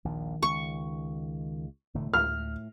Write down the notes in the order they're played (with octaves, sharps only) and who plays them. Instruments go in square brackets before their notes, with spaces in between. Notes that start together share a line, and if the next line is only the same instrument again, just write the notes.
[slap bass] A#1 D#2 A#2 [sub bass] D#3
[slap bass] C#2 [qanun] C#6
[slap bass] E1 A2 A3 [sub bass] D3
[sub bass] D2 [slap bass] A2 [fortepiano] F6